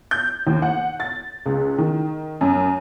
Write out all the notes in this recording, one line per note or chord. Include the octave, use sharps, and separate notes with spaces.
G6
D#2
F#5
A6
C#2
D#3
F#2